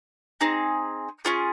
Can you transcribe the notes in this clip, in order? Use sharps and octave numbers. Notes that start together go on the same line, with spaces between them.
C4 D#4 G#4
C#4 F4 G#4